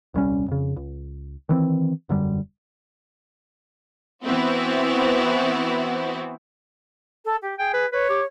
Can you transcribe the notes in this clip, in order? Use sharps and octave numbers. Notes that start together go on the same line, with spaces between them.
D#1 C2 G3 C#4
F2 C#3
C#2
D#3 E3 C4
E1 F#2 D3 G3
E3 B3 C4 E4 F#4
A4
G4
G#4 G5
B4
B4 C#5
G4